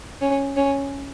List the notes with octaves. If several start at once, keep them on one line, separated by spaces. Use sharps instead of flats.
C#4
C#4